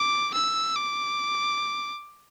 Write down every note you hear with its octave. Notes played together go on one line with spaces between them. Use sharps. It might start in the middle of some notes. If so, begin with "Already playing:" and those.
Already playing: D6
E6
D6